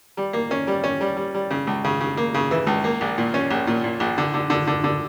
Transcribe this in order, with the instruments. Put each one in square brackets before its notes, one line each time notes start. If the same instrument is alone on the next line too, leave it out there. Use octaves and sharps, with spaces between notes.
[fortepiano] G3
A#3
C#4
G3
C#4
G3
G3
G3
C#3
C#2
C#3
C#3
A#3
C#3
E3
C#2
A#3
A#1
A#2
C#4
A#1
A#2
A#2
A#1
D3
D3
D3
D3
D3